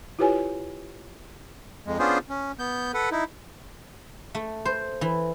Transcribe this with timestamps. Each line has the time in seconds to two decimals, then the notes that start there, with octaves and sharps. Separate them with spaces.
0.19 E4 F4 G4 B4 C#5 G#5
1.86 F2 G#3
1.99 B3 C#4 D4 F4 G#4 C5
2.29 C#4
2.59 B3 G6
2.94 A4 B4 F#5
3.11 D#4 E4
4.35 A3
4.65 C5
5.01 E3